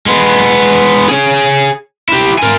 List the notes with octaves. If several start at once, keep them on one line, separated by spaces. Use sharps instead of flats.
G#3 B3
G#4 C#5
E4 G4
A#4 G#5